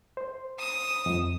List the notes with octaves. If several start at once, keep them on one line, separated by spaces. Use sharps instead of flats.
C5
D#6 E7
F2